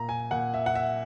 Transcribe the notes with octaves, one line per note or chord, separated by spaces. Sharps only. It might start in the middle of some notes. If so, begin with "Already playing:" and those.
Already playing: A#2 A#5
G#5
A#2 F#5
E5
F#5
E5